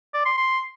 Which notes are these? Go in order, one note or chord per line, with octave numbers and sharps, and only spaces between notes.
D5
C6
C6